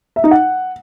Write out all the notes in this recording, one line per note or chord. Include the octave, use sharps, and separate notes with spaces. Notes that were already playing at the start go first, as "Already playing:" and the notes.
E5
D#4
F#5